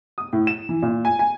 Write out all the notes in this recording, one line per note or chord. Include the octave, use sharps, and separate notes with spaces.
D#6
A2
E7
E3
A#2
G#5
G#5